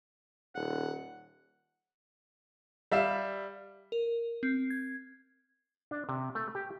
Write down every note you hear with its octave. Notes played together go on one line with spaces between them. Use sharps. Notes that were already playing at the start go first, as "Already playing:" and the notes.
D#1 F#5
G3 E5 F5 E7
A#4
C4
G#6
D4
C3
A3
G4